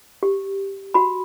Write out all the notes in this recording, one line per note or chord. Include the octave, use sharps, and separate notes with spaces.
G4
F#4 B5